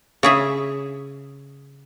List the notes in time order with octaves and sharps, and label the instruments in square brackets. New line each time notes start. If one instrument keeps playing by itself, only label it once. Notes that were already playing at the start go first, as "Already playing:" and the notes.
[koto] C#3 G#4 E5